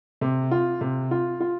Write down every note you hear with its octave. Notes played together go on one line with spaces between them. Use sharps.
C3
F4
C3
F4
F4